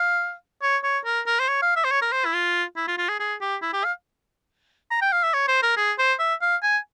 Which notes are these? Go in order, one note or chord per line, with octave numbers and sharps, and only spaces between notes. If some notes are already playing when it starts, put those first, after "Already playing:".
Already playing: F5
C#5
C#5
A#4
A#4
C5
C#5
F5
E5
C5
C#5
A#4
C5
E4
F4
E4
F4
F4
G#4
G#4
G4
E4
G4
F5
A#5
G5
F5
E5
C#5
C5
A#4
G#4
C5
E5
F5
G#5